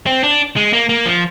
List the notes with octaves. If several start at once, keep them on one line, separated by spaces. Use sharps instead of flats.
C4
D4
G#3
A#3
A#3
F3